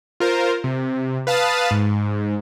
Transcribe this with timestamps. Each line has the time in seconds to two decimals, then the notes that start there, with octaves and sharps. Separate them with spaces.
0.20 F4 A#4 C5
0.64 C3
1.27 B4 F5 A5 D#6 A6
1.71 G#2